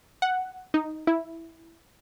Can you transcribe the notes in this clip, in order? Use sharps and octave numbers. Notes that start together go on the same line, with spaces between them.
F#5
D#4
E4